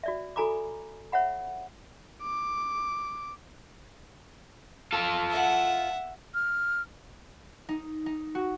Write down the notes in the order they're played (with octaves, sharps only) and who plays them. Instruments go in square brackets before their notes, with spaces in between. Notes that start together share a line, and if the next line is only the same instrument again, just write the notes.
[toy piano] F#4 D5 E5
F#4 A4 G#5 A#5 B5 D6
C#5 E5 F#5 B5
[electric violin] D6
[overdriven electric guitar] F4 A4
[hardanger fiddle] E5 F#5
[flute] F6
[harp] D#4
D#4
F#4